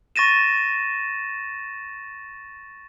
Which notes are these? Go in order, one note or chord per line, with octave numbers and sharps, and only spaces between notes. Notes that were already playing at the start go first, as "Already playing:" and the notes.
C#6 A6 A#6 D#7 E7